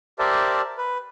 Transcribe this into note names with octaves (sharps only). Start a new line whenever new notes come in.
G4 A#4 C5 D5 E5 A5
B4